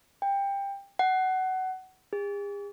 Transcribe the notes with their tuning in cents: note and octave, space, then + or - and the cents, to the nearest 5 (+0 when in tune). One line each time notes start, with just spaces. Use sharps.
G5 +20
F#5 +20
G#4 -45